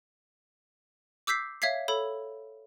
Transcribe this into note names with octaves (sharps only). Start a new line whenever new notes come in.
D6 E6 G6 B6 C7
C#5 E5 F5 G#6 B6 C7
A4 C#5 B5